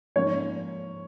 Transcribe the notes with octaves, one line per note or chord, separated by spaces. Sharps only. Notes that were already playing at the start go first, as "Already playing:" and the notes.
G#2 F3 A#3 C#4 C#5